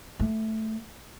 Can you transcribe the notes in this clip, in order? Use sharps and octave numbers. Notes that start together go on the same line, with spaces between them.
A3